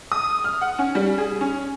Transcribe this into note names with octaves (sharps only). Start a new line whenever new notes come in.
D#6
F6
F#5
C#4
G3
G#4
C#4